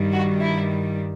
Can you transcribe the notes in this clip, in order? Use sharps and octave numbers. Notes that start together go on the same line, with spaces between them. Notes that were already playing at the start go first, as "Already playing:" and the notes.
Already playing: G2 D#3 G3
F#4
E4